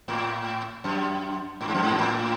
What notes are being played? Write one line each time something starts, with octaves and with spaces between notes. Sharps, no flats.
A2
F#2
A2
G#2
F#2
G#2
B2
A2